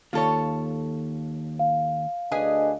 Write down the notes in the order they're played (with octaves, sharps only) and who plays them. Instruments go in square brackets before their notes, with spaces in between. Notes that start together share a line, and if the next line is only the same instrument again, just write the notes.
[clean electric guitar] D#2 [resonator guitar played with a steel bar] F4 A4 C#5
[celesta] F5
[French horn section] D2 D4 D#5 [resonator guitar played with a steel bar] G#4 B4 G#5